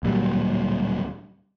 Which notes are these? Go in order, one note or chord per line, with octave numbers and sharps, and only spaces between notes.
D1 A#2 F#3 G3